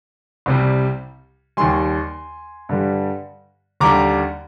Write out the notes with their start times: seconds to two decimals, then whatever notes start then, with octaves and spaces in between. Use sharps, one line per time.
0.46 C2 C3 G3
1.57 D#2 D#3 G3 G#5 C6
2.69 G2 D3 G3
3.80 D#2 D3 G3 A#5 D6